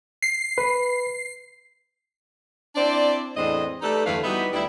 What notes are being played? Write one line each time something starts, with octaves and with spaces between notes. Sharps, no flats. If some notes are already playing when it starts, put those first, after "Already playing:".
C7
B4
C4 D4 E4 C5 D5
E2 A2 G#3 C4 D4 D#5
A3 D#4 G4 A4 B4 D5
E2 G2 D3 A3 B4 F5
G3 B3 D#4 E4 F#4 B4
D2 G3 D4 E4